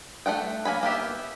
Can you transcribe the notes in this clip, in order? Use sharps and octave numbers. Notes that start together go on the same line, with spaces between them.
A3 D#4 F#5 G5
F#3 A#3 G#5 B5
A#3 B3 G4 E5